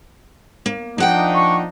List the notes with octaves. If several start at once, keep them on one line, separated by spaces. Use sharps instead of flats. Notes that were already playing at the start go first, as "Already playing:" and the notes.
A#3
F3 A#3 D4 D#4 F#5 G5
C#6